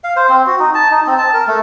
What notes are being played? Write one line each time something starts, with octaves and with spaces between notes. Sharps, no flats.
F5
C5
C4
F#4
D#4
A5
D#4
C4
A5
A#4
A3